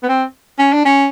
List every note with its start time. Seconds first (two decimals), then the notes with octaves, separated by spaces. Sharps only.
0.03 B3
0.09 C4
0.59 C#4
0.73 D4
0.85 C#4